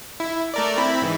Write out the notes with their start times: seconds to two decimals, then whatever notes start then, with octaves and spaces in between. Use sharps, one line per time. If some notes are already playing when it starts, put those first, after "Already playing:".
0.20 E4
0.54 A3 A#4 D5
0.77 C4 E4 B5
1.02 G#2 E3